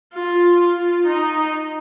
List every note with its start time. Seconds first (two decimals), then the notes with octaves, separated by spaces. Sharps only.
0.13 F4
0.59 F4
1.06 D#4